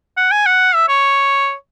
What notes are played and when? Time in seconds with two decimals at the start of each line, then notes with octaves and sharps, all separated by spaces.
0.17 F#5
0.31 G#5
0.46 F#5
0.75 E5
0.89 C#5